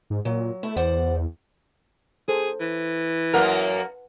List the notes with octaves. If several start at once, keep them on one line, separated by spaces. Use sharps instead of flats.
G#2
A#2 F#3
A3 E4
E2 C5 D5 F#5
G#4 A4 C5
E3
F#2 A#3 A#4 B4 F#5 A5